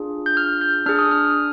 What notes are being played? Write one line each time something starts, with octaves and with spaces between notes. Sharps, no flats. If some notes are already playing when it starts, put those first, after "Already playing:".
Already playing: D4 F4 G#4
G6
F6
G6
D4 G#4 F6
D#6
F6